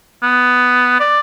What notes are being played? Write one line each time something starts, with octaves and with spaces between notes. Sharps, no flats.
B3
D5